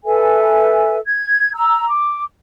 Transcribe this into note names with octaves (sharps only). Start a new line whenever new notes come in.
A4 B4 E5 G#5
G#6
A#5 E6
D6